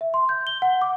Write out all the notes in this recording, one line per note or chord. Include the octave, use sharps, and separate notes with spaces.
E5
C6
G6
G7
F#5
D6